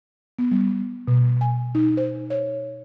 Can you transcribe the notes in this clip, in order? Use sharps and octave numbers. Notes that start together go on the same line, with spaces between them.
B3
G3
B2
G#5
D#4
C5
C#5